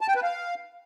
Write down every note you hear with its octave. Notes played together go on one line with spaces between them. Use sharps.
A5
G5
B4
F5